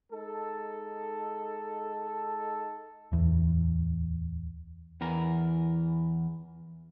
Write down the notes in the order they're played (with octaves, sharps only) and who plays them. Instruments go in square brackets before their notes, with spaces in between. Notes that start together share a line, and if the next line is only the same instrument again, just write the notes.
[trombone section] G#3 D#4 A4
[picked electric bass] D1 E2
[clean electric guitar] E2 E3 A#4